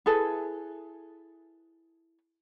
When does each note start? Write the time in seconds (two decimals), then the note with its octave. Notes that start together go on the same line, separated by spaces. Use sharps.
0.06 E4 G#4 A4 B4